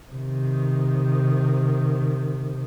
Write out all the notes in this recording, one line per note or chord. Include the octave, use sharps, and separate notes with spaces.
C3 D#3